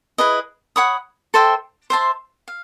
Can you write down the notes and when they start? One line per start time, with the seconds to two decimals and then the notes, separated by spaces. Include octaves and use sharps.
0.18 E4 G#4 B4 D#5
0.76 C#5 F#5 B5 D#6
1.34 A4 C5 E5 G5
1.90 C5 E5 A5 C6
2.48 F5